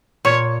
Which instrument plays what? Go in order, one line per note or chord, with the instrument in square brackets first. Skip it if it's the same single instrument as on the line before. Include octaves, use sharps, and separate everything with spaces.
[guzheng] A#2 [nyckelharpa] C#5